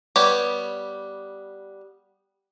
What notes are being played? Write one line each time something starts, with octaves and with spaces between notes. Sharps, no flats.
G3 B3 G4 C#5